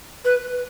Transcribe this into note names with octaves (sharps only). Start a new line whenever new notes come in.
B4